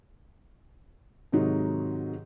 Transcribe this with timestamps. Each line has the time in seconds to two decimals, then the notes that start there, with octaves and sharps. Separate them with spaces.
1.32 G#2 C3 D#3 F#3 D#4 F#4